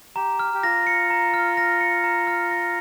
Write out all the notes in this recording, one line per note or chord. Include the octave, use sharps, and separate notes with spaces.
G4 A#5
F6
G4
F4 A#6
C#7
A#5
F6
A#6
C#7
A#5
F6
A#6